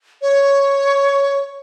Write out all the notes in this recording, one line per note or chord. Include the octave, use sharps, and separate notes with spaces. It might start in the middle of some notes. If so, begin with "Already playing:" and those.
C#5